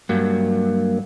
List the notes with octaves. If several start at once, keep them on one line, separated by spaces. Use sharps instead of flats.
G2 F#3 A#3